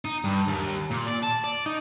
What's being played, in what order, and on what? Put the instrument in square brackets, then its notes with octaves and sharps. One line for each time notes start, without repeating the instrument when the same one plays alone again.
[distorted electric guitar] D#4
G2
D#2
A#2
D5
A5
D5
D#4